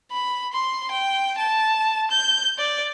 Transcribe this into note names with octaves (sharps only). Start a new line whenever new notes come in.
B5
C6
G5
A5
G6
D5